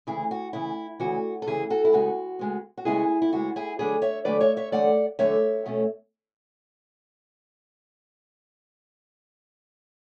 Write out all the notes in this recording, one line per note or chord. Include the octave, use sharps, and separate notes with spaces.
D2 C#3 E3 E4 G#4
F#4
D2 C#3 E3 E4
D2 C#3 E3 F#4
A4
D2 C#3 E3 E4 G#4
F#4 A4
E4
C#3 G#3 B3 F#4
C#3 G#3 B3
F#4
C#3 G#3 B3 E4 G#4
E4
C#3 G#3 B3 F#4
E4 G#4
E2 D3 F#3 A3 D4 G#4 B4
C#5 E5
E2 D3 F#3 A3 D4 B4 D5
C#5 E5
C#5 E5
E2 D3 F#3 A3 D5 F#5
E2 D3 F#3 A3 C#5 E5
B2 A3 C#4